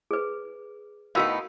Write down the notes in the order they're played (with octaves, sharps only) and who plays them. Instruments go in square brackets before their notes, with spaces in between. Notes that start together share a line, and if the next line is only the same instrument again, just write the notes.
[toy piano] G#4 B4
[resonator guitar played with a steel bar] A2 B3 D#4 [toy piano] F#4 A#4 F5